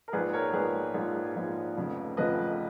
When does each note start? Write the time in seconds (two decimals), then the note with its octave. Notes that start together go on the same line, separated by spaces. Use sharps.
0.08 A#4
0.13 A#1 G#2 F3 G#4 B4
0.33 A#4 C#5
0.53 A#1 G#2 F3 G#4 B4
0.94 A#1 G#2 F3
1.36 A#1 G#2 F3
1.77 F1 F2 C#3 F3
2.17 F1 F2 C#3 F3 B4 D#5